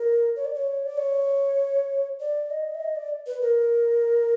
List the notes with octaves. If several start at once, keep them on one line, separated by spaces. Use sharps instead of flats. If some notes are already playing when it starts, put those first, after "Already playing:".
Already playing: A#4
C#5
D5
C#5
D5
C#5
D5
D#5
E5
D#5
D5
B4
A#4